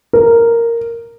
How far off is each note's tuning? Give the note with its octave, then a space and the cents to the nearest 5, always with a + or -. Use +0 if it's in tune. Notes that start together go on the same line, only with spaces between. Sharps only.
A#4 -5